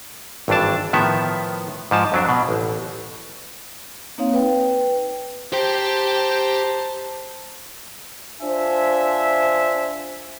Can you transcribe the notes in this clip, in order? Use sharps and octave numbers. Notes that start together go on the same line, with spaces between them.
G#1 G2 E3 D4 A5
A2 D#3 F3 B3 E5
G#2 F3 A5
F2 F#3 D4
B2
A1
A#3 C4 D#4 C#5 F5
B4 G5
G4 C5 G5 A5 A#5
D4 F4 C5 E5 G#5